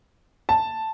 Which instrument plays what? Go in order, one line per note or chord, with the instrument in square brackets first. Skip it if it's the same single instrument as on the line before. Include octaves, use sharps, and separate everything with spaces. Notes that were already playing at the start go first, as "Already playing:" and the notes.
[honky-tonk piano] A5